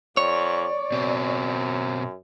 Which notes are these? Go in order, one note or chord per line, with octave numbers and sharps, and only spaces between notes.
F2 C#5 D5
F#2 B2 C4